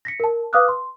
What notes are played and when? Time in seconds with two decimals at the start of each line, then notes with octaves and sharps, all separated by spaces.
0.05 A#6 B6 C#7
0.20 A#4 A5
0.53 B4 F5 D6 D#6 F6 F#6
0.68 C6